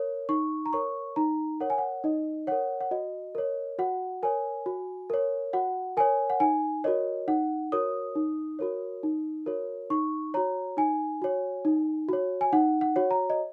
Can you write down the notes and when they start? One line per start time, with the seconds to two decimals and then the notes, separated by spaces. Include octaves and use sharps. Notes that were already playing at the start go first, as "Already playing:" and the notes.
Already playing: A#4 C#5
0.29 D#4 C#6
0.66 A#5
0.73 A#4 C#5 C#6
1.16 D#4 A#5
1.60 A#4 C#5 F#5
1.70 G#5
1.78 F#5
2.04 D#4 D#5
2.47 A#4 C#5 F#5
2.81 F#5
2.91 F#4 D#5
3.35 A#4 C#5
3.79 F#4 F#5
4.23 A#4 C#5 G#5
4.66 F#4
5.10 A#4 C#5
5.53 F#4 F#5
5.97 A#4 C#5 G#5
6.30 F#5
6.40 D#4 G#5
6.84 F#4 A#4 C#5 D#5
7.28 D#4 F#5
7.72 F#4 A#4 C#5 D#6
8.15 D#4
8.59 F#4 A#4 C#5
9.03 D#4
9.46 F#4 A#4 C#5
9.90 D#4 C#6
10.34 F#4 C#5 A#5
10.77 D#4 G#5
11.22 F#4 C#5
11.65 D#4
12.09 F#4 C#5
12.41 G#5
12.53 D#4 F#5
12.81 F#5
12.96 F#4 C#5
13.11 A#5
13.30 D#5